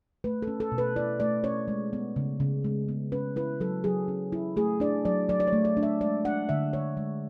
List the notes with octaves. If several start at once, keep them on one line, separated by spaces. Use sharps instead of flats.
A3 B4
A4
C#4
A4
B2
B4
E4 D5
A3 D5
C#4 C#5
G#3
B3
C#3
C#3
G#3
B3
C#4 B4
E4 B4
F#3 A4
F#3 G#4
C#4
E4
A3 G#4
D4 D5
F#3 D5
F#3 D5
D5
C#5
A3
D5
D4
E5
G#3 D5
D4 F#5
D3 E5
D3 C#5
G#3